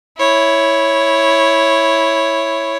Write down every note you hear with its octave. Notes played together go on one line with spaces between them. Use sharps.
E4 C#5